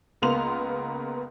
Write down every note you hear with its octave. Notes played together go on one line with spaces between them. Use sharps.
C#2 A#3 B3 C6 F7